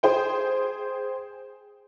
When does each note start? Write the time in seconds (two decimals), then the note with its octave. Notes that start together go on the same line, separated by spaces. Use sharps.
0.03 G#4 C5 G5